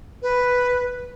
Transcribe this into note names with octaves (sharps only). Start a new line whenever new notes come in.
B4